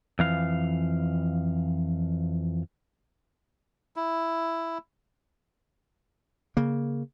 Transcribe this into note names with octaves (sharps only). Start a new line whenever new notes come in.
F2 E3 F5
E4
C#3 A#3